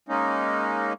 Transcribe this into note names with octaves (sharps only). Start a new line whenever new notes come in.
G#3 A#3 C#4 D#4